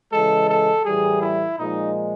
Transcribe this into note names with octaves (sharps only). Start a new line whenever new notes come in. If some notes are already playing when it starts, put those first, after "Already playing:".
C#3 E3 G#3 A4
A4
A2 E3 G3 G#4
E4
A#2 F3 G#3 D#4